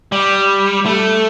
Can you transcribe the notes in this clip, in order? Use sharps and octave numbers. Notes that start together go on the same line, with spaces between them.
G3
A3